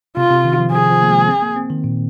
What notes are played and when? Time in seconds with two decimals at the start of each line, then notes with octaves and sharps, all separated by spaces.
0.17 C3 F4
0.31 C3
0.45 D#3
0.58 F3
0.72 F3 G#4
0.91 F3
1.02 A#3
1.09 G#3
1.28 C4
1.42 A#3
1.56 C4
1.70 D#3
1.84 A#2